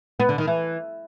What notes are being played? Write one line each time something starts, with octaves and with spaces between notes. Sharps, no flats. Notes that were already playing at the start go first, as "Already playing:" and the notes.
B3
D3
D#3
E3